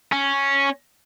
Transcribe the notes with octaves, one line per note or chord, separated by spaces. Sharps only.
C#4